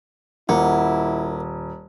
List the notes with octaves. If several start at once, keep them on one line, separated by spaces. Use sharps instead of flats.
D#1 A#3 E4 F#5